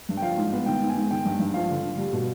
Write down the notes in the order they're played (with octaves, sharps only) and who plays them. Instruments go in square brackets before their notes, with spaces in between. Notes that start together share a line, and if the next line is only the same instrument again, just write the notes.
[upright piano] G2
G5
F3 F5
G#2
B3
D#3 G5
G#2
G#5
G#2
D#3 G5
G2
G2
F3 F5
D3
D3
G3
B2